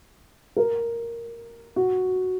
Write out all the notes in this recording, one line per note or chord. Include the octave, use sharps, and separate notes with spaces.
A#4
F#4